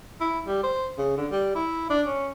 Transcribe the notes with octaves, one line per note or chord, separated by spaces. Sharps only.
E4
G3
C5
C#3
D3
G3
E4
D4
C#4